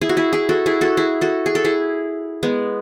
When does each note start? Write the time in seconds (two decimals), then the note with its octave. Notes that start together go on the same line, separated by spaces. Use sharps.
0.01 E4 G#4
0.09 F#4
0.17 E4 G#4
0.33 E4 G#4
0.49 F#4 A4
0.66 E4 G#4
0.81 F#4 A4
0.97 E4 G#4
1.21 F#4 A4
1.46 G#4
1.55 A4
1.64 E4 G#4
2.43 G#3 B3